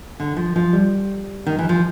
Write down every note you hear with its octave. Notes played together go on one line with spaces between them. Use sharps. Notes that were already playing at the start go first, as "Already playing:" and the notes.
D3
F3
F3
G3
D#3
E3
F3